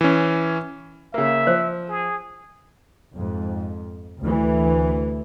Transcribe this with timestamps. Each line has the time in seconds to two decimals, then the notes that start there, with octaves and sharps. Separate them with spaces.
0.01 E3 C#4
1.14 C#3 A#3 E5
1.47 F3 C5
1.89 G#4
3.14 F2 G#2
4.21 D2 E3